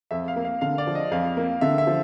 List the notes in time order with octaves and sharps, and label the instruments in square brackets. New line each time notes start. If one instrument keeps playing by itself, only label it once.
[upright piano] F2 [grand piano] E5
[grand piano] F5
[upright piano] A#3
[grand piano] F5
[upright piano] D3 [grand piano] F5
[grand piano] D5
[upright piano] F3
[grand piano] D#5
[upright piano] F2 [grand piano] F5
[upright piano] A#3
[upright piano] D3 [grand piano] E5
[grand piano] E5
[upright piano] F3